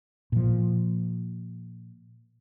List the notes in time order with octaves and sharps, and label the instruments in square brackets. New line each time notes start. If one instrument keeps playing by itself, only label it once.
[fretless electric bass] A#2 F3